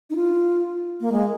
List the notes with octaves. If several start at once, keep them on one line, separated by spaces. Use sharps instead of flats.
D#4
F4
A#3
G#3